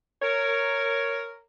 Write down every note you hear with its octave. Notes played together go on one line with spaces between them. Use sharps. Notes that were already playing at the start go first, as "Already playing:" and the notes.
A#4 C#5